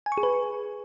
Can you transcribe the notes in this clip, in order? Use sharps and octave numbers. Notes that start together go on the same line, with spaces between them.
G#5
C#6
G#4
B4